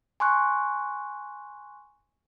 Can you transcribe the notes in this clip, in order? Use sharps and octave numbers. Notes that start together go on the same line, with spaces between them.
G#5 C6 C#6 F#6